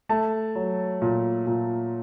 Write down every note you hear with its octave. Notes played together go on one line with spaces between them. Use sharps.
A3 A5
F#3
A#2
A#2